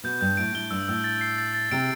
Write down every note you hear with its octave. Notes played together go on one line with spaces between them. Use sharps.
B2 G6
G2 G6
A2 D7
A2 G7
G2 E6
A2 E6
A6
C7
A6
A6
C3 D7